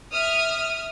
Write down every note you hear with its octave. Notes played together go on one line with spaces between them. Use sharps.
E5 D#6 F6